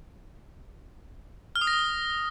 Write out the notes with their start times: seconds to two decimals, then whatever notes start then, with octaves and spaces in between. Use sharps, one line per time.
1.56 F6
1.61 D#6
1.67 A#6
1.73 D#6